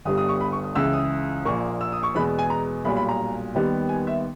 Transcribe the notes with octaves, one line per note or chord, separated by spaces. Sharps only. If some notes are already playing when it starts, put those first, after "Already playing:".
G1 G2 G3 B3 D#6
D#6
C#6
B5
C#6
D#6
C#2 C#3 E3 E6
D#6
A#1 A#2 A#3 C#6
E6
D#6
C#6
E2 B2 G#3 B3 B5
G#5
A#5
B1 A#2 G3 B5
B5
A#5
D#2 D#3 G3 B3
G#5
E5